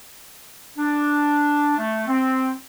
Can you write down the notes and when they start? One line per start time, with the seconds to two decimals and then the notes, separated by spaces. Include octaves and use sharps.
0.77 D4
1.78 A3
2.07 C4